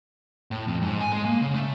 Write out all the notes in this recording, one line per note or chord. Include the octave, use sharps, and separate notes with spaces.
A2
F2
G#2
G#5
G#3
A#3
C#3
A3